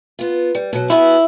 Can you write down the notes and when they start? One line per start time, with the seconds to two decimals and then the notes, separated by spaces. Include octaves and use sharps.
0.19 B3 F4
0.55 G3
0.73 B2 F#3
0.90 B3 E4 F#4 G#4